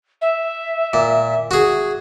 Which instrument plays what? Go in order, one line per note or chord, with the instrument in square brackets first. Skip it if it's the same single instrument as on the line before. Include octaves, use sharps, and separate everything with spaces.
[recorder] E5
[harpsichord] A#2
F#4 G#4